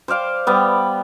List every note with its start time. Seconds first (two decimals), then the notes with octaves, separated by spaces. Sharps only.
0.08 C5 D5 F5 D6
0.47 G3 B3